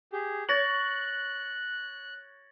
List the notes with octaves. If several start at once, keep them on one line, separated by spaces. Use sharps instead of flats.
G4 G#4
C#5 F#6 A6 A#6 F#7